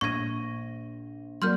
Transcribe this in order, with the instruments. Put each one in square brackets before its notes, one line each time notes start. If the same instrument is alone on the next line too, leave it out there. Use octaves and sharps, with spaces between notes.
[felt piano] A#1 A#6 D#7 [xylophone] C#6 G#6
[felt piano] F#3 A#3 D5 [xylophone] C6 F6 G6